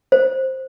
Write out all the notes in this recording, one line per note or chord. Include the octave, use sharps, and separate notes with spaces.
C5